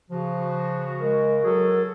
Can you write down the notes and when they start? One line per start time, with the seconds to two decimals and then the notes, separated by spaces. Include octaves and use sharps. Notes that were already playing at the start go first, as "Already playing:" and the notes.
0.11 C#3 F3 F#4
1.00 G#3 A#4
1.44 F#3 F#4 G#4 A4